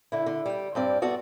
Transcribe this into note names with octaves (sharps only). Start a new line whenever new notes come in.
D3 E4
D3
G3 G5
G2 C4 D5
B3 F#4 A4 D5